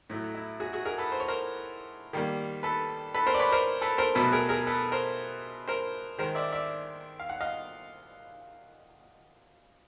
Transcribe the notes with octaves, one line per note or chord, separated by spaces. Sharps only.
A2 F#3 A3
E4
F#4 G#4
F#4 G#4
G#4 A#4
A4 B4
C5
C#5
A#4 C5
D#3 G3 A#3
A4 B4
A4 B4
A#4 C5
D5
B4 C#5
A#4 C5
A4 B4
A#4 C5
B2 F#3 A3 A4 B4
G#4 A#4
G#4 A#4
A4 B4
A#4 C5
A#4 C5
D#3 G#3 A#4 C5
D5 E5
D5 E5
F5
F#5
D#5 F5